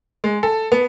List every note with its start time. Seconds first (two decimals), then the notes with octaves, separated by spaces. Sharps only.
0.24 G#3
0.43 A4
0.72 B3